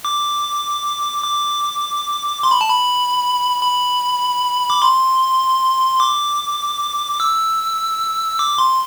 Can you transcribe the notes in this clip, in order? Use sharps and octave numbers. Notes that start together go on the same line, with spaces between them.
D6
D6
C6
B5
A5
B5
B5
D6
C6
D6
E6
D6
C6